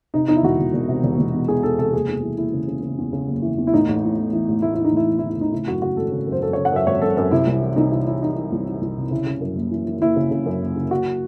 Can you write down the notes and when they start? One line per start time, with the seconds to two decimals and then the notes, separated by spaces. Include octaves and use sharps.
0.14 C3 D#4
0.28 E2 D#4
0.36 E4
0.43 E1 F#4
0.59 E1
0.73 E1
0.89 C3
1.03 E1
1.19 E1
1.34 E2
1.48 E2 G#4
1.63 E2 A4
1.78 C3 A4
1.93 F#1 G#4
2.09 E2
2.23 E3
2.38 F#1 E4
2.53 C#3
2.68 C#3
2.83 C#3
2.98 E2
3.13 C#3
3.28 F#1
3.42 E3
3.58 E2
3.67 E4
3.73 A1 D#4
3.88 A1
4.03 A2
4.18 E3
4.33 E3
4.48 A1
4.62 A2 E4
4.74 E3 E4
4.84 D#4
4.92 A1 E4
5.08 E3
5.19 E4
5.22 A1
5.29 E4
5.38 A1 D#4
5.52 C#3 E4
5.67 F#2 F#4
5.82 C#3 F#4
5.97 G#1 A4
6.12 C#3
6.27 F#2
6.32 C5
6.42 F#2 A4
6.53 C#3 C#5
6.65 F#5
6.72 F#2 E5
6.86 G#1 C#5
7.02 F#2 A4
7.17 F#2 A4
7.31 C3 E4
7.47 C2
7.62 E3
7.76 C2 D#4
7.92 C3 E4
8.06 E3 E4
8.22 E3 D#4
8.36 E3
8.52 C2
8.67 E3
8.81 C2
8.97 C3
9.11 C#3 E4
9.26 C#3
9.41 F#2
9.56 F#1
9.72 E3
9.86 E3
10.01 F#1 E4
10.16 C#3
10.31 C#3
10.46 F#2
10.62 F#1
10.76 C#3
10.91 F#1 F#4